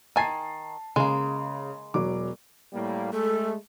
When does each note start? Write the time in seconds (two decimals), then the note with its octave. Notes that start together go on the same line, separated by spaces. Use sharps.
0.16 D#3 G#5 A5 A6 C7
0.96 C#3 G#3 A#3
1.94 E1 F#3 D6
2.73 A2 G3 A#3
3.13 G#3 A3 A4